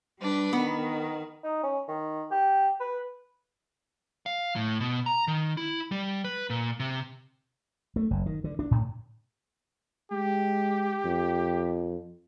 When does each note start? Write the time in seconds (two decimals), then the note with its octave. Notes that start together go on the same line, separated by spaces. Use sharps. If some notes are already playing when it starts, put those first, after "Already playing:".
0.18 G3 D4 B4
0.53 D#3 B3
1.44 D#4
1.63 C#4
1.88 D#3
2.31 G4
2.80 B4
4.26 F5
4.56 A2
4.80 B2
5.06 A#5
5.28 D#3
5.57 E4
5.92 G3
6.24 B4
6.50 A#2
6.80 C3
7.96 A3
8.11 F#1
8.26 D#3
8.44 D3
8.59 D4
8.71 A2
10.12 G#3 G4
11.05 F2